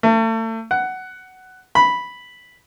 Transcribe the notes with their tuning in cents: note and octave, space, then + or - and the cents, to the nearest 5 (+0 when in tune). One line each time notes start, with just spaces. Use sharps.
A3 +35
F#5 +10
B5 -5